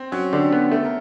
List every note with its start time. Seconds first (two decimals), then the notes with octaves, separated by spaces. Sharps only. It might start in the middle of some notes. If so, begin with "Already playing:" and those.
Already playing: C4
0.12 F#3 C#4
0.32 D3 G4
0.53 B3
0.72 A3 A4
0.85 A#4